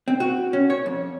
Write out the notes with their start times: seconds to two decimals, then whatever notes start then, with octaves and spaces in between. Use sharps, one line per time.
0.08 C4
0.20 F#4
0.53 C#4
0.70 C#5
0.86 F2